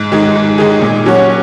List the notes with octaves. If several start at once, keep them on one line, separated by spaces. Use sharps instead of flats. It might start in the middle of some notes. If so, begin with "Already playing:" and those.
Already playing: G#2
D#3 G#3 D#4 G#4
G#2
D#3 G#3 D#4 G#4
A#2
F#3 C#4 F#4 C#5